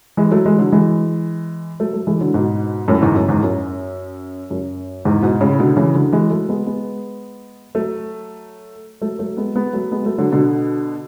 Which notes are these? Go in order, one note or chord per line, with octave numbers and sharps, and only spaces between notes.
E3 G#3
F#3 A3
E3 G#3
D3 F#3
E3 G#3
F#3 A3
F#3 A3
E3 G#3
D3 F#3
G#2 B2
F#2 A2
E2 G#2
F#2
E2 G#2
F#2
F#2
E2 G#2
G#2 B2
A2 C#3
B2 D3
C#3 E3
D3 F#3
E3 G#3
F#3 A3
G#3 B3
G#3 B3
F#3 A3
F#3 A3
F#3 A3
G#3 B3
G#3 B3
F#3 A3
G#3 B3
F#3 A3
D3 F#3
B2 D3